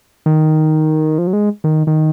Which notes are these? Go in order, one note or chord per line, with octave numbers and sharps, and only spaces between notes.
D#3
F3
F#3
G#3
D#3
D#3